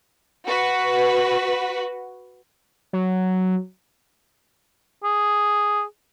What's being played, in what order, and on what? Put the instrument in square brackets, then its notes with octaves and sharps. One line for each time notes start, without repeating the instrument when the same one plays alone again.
[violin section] F#4 B4
[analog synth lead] F#3
[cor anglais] G#4